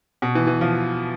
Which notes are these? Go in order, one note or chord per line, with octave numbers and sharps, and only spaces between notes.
B2
E3
E3
F3